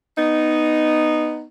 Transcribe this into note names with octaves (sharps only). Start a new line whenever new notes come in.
B3 D#4